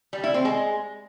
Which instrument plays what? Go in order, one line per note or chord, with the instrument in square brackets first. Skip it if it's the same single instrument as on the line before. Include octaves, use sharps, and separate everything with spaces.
[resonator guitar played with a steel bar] G3
E4
C4
G#3